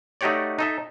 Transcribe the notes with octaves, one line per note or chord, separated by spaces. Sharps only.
A3 D#4 F#4 G4 C#5 D5
D#4 A4 E5